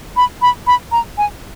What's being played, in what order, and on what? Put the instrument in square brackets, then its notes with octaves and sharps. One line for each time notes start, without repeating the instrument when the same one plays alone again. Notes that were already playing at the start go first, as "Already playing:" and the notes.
[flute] B5
B5
B5
A#5
G#5